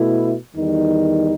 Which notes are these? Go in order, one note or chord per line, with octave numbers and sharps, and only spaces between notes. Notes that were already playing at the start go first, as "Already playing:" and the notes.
Already playing: B2 A3 E4
E2 D#3 G3 D#4